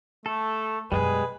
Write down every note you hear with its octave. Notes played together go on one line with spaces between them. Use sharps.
A3 A4
F#2 B2 G3 G#3 G#4 B4